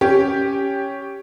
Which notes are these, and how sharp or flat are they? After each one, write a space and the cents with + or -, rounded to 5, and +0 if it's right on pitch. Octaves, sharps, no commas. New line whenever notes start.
C#4 +5 G4 +0